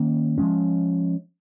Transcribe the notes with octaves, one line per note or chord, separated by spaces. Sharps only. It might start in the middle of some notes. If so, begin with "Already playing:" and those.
Already playing: D#3 A#3 C#4
F3 G#3 C#4